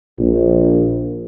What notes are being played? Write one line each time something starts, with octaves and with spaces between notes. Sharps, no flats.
A#1